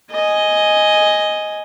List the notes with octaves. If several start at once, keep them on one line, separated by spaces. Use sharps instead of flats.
D#5 G#5